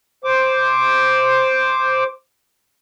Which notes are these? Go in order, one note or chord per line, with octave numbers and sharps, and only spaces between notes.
C5 D6